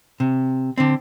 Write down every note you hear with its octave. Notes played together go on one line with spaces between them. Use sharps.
C3
D3 C4